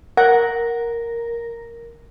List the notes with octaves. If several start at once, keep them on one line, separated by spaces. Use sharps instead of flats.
A#4 F#5